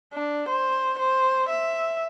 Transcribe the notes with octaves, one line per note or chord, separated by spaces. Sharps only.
D4
C5
C5
E5